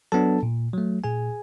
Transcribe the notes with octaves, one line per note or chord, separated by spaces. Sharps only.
F#3 B3 D4 A4 A5
A#2
F#3 A3
A#2 G#4 G#5